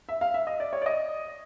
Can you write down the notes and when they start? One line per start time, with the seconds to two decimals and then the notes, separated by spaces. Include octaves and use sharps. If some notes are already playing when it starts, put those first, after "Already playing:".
0.09 E5
0.21 F5
0.34 E5
0.47 D#5
0.60 D5
0.73 C#5
0.82 D5
0.86 D#5